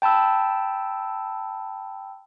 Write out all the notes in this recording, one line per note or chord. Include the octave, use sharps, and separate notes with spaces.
G5 A5 B5 E6